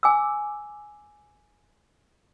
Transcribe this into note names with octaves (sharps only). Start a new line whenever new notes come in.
G#5 D6 E6